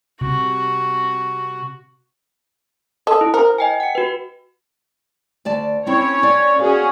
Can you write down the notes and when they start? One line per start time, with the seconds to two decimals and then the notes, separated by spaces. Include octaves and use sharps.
0.21 C3 F#4
3.07 A4 D#5 D#6
3.21 E4
3.34 A#4 C5
3.58 D#5 G5 G#5
3.80 F#5 C#7
3.95 F#4 B4
5.45 D2 D5 A5
5.87 C4 C#4 E4 C#5
6.23 D5
6.59 C#4 F#4 G#4 F5